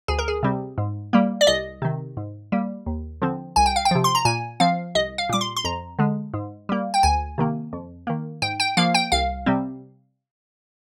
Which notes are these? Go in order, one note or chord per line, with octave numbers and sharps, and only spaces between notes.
D2 G#4
A#4
G#4
C3 G3 C4
G#2
G3 A#3
D5
C2 D#5
C3 D#3
G#2
G3 A#3
D#2
D3 F3 C4
C2 G#5
G5
F5
G5
C3 F3
C6
A#5
A#2 G#5
F3 C4 F5
C2 D#5
F5
A#2 G3 D6
C6
C6
F2 A#5
D3 G#3
G#2
G3 A#3
G5
D2 G#5
C3 D#3 A#3
F2
D#3 A#3
G#2 G5
G5
F3 A#3 F5
G5
C2 F5
C3 G3 C4